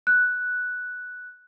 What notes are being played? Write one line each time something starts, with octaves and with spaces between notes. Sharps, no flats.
F#6